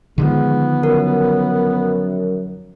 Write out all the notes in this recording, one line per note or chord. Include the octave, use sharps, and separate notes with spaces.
D3 D#3 F3 G#3 B3
F#2 A#4